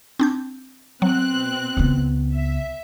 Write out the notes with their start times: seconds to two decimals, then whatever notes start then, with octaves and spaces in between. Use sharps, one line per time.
0.20 C4 D4 G6
1.02 B2 F#3 C4 F#6
1.77 C#2 B3
2.34 E5